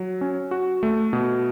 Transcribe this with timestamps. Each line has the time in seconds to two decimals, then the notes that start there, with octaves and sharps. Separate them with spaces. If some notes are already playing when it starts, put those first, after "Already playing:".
Already playing: F#3
0.21 C#4
0.51 F#4
0.83 A3
1.13 B2